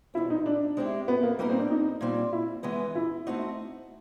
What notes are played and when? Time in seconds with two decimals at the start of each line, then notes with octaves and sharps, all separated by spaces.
0.14 E2 B2 G3 C4 E4
0.30 D#4
0.46 D4
0.77 G#3 C4 E4 G4
1.08 B3
1.23 A#3
1.39 G3 A#3 B3 D#4 G4 A#4
1.50 C4
1.59 D4
1.70 D#4
2.01 A#2 G3 C4
2.33 E4
2.63 E3 G#3 B3
2.95 E4
3.27 A3 C4 D#4 F#4